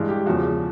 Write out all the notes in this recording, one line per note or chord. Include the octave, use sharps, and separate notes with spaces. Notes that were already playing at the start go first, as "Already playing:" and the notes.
Already playing: G2 E3 G#3
G4
E2 C#3 F3 F#4